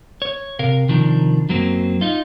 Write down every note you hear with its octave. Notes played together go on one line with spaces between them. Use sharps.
C#5
C3 A#4 F5
C3 D#3 F3 D4 A#4
F#2 F#3 A#3 C4
D#4 F4